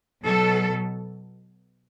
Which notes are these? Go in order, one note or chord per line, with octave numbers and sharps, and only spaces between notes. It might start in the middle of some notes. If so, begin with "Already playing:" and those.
B2 F#3 A4